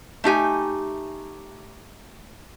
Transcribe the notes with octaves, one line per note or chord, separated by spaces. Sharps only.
A3 D#4 G4 G#5